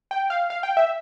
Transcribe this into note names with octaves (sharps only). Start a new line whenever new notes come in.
G5
F5
F5
G5
E5